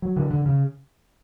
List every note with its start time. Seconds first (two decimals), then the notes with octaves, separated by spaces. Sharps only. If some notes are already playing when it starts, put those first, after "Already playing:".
0.02 F#3
0.16 D3
0.31 D3
0.46 C#3